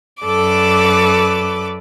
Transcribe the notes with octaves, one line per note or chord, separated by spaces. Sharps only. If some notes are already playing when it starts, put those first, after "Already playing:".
F#2 A4 B4 D5 D6